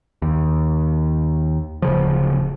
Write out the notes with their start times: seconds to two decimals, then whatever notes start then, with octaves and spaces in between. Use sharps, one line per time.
0.22 D#2
1.82 D1 C#3 F3